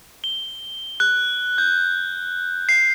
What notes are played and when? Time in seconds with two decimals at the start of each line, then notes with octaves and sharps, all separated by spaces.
0.24 G7
1.00 F#6
1.58 G6
2.69 C7